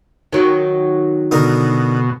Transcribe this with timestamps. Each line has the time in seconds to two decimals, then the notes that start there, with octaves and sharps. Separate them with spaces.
0.33 D#3 F#3
1.31 B2 D3 D#4 A#4